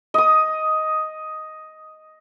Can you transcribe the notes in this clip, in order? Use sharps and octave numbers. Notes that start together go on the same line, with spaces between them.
D#5 D#6